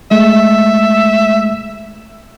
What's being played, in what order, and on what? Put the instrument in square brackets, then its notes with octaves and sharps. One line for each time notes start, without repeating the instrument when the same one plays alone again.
[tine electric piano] G#3 A3 [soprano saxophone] E5